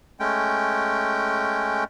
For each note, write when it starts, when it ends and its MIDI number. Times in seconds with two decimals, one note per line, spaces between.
0.20 1.84 56
0.20 1.84 57
0.20 1.84 61
0.20 1.84 79